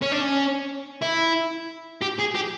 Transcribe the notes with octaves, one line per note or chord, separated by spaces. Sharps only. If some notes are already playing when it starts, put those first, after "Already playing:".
C#4
D4
C#4
E4
G4
G#4
G4